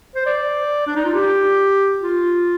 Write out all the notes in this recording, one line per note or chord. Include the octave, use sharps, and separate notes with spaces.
C5
D5
D4
D#4
F4
G4
F4